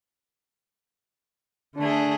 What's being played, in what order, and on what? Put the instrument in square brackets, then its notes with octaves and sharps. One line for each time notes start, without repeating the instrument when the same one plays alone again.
[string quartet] D3 A3 G#4 [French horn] D4